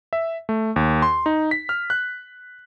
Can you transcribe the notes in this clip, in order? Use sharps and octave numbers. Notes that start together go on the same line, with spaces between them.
E5
A3
D#2
C6
D#4
B6
F6
F#6